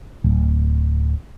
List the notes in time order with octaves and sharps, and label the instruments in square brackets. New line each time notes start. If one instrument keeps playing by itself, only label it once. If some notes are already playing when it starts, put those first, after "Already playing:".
[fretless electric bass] D1